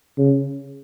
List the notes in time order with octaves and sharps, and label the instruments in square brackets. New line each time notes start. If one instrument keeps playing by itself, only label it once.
[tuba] C#3